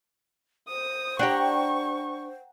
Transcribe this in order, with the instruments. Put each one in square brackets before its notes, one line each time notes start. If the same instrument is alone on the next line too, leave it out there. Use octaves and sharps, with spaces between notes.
[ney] C5 [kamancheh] D#6
[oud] D4 G4 [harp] F#5 G5 A#5 [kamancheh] C#6